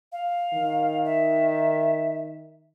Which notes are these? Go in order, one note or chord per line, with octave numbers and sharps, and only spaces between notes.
F5
D#3
E5